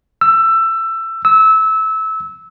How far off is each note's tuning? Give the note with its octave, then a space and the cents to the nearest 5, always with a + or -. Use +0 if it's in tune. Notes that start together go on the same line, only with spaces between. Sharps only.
E6 +20
E6 -20